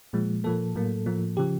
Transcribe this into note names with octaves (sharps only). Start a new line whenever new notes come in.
A#2 F3 G#3
A#2 F3 A#3 A4
A2 F#3 A#3
A2 F3 A#3
C#3 F3 G4